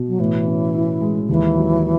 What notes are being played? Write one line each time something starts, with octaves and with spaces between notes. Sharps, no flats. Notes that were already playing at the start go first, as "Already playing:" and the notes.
Already playing: B2
F#3
A2 E3
C#4
E4
G#3
D#2 E3
F#3